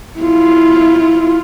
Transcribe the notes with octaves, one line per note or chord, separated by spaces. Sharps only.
E4 F4